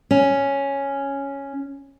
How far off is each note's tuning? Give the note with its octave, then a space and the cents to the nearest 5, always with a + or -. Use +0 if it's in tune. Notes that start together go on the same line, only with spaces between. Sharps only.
C#4 +0